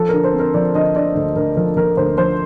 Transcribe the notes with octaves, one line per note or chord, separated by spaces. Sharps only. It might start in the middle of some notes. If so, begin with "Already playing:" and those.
Already playing: F3 A4
D3 A#4
C5
C4
A#4
F3 D5
D3 D#5
D3 D5
D2
D2 A#4
F3 A#4
F3 A#4
D2 C5
F3 C5